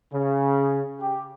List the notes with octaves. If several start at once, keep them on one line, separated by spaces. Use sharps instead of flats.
C#3
G4